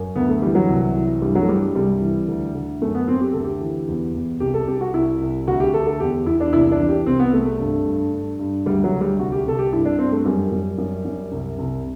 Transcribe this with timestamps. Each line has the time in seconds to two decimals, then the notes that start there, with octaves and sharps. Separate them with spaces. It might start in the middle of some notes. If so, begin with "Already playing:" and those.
Already playing: F#2
0.16 D2 B3
0.29 A3
0.42 E3 G3
0.55 F#3
0.69 C2
0.95 E3
1.22 G2 G3
1.35 F#3
1.42 A3
1.48 G2 G3
1.61 G3
1.75 C2 G3
2.01 E3
2.28 D2
2.54 D2
2.81 F#2 A3
2.95 B3
3.08 F#2 C4
3.21 G4
3.33 D2 A4
3.45 G4
3.60 E3
3.88 E2
4.14 E2
4.40 C2 G4
4.54 A4
4.67 C2 G4
4.81 F#4
4.93 C2 E4
5.21 C2
5.47 D2 F#4
5.60 G4
5.74 D2 A4
5.87 A4
6.00 E2 G4
6.26 E2 E4
6.40 D4
6.53 C2 E4
6.71 D4
6.80 E3
6.89 G4
7.06 C2 C4
7.20 B3
7.32 C2 A3
7.46 A3
7.59 G2
7.86 G2
8.12 G2
8.39 G2
8.66 D2 G3
8.84 F#3
8.93 D2
9.01 G3
9.19 C2 F#4
9.32 G4
9.46 C2 A4
9.59 G4
9.72 G2 E4
9.85 D4
9.99 G2 C4
10.12 A3
10.25 F#2 G3
10.52 F#2
10.78 F#2
11.05 F#2
11.32 C2
11.58 C2